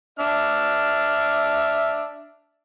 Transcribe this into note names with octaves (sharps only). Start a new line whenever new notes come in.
D4 E5 F6